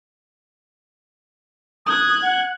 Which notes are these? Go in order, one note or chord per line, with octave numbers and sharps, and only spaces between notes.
D#6 F#6 G#6
F#5